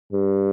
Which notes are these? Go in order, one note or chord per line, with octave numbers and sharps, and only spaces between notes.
G2